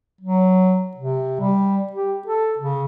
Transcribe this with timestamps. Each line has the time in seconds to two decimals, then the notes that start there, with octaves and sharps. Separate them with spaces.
0.21 F#3
0.97 C3
1.40 G3
1.93 G4
2.28 A4
2.58 C#3